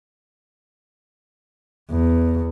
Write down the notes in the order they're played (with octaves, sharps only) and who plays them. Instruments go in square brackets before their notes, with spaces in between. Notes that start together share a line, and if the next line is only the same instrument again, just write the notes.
[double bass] E2